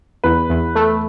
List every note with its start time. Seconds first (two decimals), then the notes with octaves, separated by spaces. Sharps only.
0.24 E2 B4
0.49 E2
0.75 A3